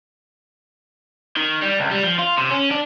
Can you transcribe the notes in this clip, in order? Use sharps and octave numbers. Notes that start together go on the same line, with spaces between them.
D#3
G3
C#2
G3
F3
F4
C3
C#4
D4